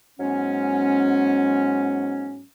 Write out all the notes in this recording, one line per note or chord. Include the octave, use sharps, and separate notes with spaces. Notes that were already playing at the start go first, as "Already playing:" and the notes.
G#2 F#3 G#3 B3 C#4